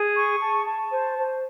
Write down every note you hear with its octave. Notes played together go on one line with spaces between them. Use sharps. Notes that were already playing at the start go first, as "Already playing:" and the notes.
Already playing: G#4
C#6
A5
A5
C5
C5